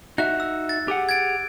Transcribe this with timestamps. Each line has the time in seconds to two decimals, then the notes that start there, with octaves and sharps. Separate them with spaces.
0.18 D#4 F#4 E5 F#6
0.40 E6
0.69 A6
0.88 G4 G#4 F#5
1.09 G#6 A6 D7